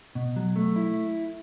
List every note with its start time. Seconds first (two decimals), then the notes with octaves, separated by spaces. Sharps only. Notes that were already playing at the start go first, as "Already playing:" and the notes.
0.15 B2
0.36 F#3
0.56 A3
0.76 E4